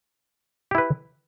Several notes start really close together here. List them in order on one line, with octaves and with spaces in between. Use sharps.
G4 E4 B4